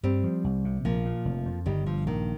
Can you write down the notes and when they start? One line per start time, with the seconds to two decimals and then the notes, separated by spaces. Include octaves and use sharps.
0.03 G2 G3 C4
0.24 F3
0.44 C2
0.65 C3
0.85 A#1 F3 A#3
1.05 A#2
1.25 F1
1.45 F2
1.66 G1 D#3 G3
1.86 G2 F3
2.06 A#1 D#3